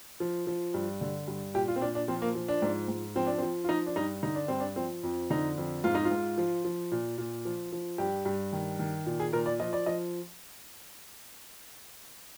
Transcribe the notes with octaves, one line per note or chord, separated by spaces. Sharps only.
F3
F3
G2
D3
G2
A#2 G4
F4
C4
A#2 D4
D4
F3 C4
A#3
F3
D4
G#2
G#2
F3 C4
D4
F3 C4
F4
F3 D#4
D4
G2 D#4
D3 D#4
D4
G2 C4
D4
F3 C4
F2
D3 D#4
F2
G#2 F4
D#4
F4
G#2
F3
F3
A#2
A#2
F3
F3
G2 G4
G2
D#3
D#3
A#2
G#4
A#2 A#4
D5
F3 D#5
D5
F3 D#5